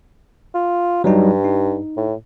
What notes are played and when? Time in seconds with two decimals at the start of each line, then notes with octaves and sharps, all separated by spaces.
0.54 F4
1.04 G2 F#3 G3 D#4
1.44 D#4
1.97 A2